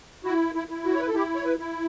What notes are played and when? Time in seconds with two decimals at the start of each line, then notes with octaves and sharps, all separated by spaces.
0.24 E4 F#4
0.55 E4
0.69 E4
0.85 F#4
0.93 C#5
0.99 B4
1.08 A4
1.14 E4 G4
1.35 C#5
1.45 B4
1.59 E4